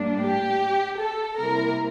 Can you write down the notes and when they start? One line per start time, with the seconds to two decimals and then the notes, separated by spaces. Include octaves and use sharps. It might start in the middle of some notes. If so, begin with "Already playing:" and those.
Already playing: A2 G3 A#3 D4
0.21 G4
0.99 A4
1.37 C3 G3 A#3 E4 A#4